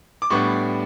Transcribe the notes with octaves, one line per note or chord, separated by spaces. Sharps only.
D6
A2 G3 B3 D4 C#6